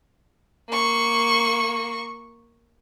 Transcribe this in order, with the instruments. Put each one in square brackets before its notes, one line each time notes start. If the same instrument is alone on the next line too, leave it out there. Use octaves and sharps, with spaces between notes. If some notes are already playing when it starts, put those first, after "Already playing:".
[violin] A#3 C#6